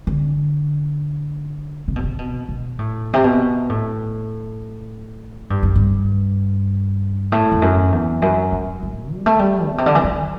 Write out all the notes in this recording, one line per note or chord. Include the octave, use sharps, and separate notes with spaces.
D3
C3
B2
C3
B2
B2
A2
C3
B2
A2
G2
F#2
G2
A2
E2
F#2
E2
F#2
G2
A2
G3
A3
G3
B2
C3
D3
E3
F#3